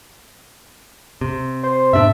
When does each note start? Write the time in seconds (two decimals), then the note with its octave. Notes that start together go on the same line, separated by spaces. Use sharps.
1.21 C3
1.63 C5
1.93 G#2 B2 D4 E5